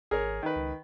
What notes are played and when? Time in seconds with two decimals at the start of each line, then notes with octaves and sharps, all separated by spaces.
0.11 G#1 G#4 A#4 C#5
0.43 D#3 B4
0.56 C#2